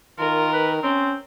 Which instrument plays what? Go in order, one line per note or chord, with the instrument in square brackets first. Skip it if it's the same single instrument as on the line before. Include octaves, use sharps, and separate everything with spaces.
[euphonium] D#3 [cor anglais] F4 [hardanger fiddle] A#4
[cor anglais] B4
[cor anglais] C4 [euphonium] C#4